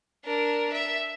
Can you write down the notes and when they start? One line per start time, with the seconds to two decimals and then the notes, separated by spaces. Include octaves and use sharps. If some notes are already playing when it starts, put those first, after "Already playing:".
0.25 D4 A#4
0.73 E5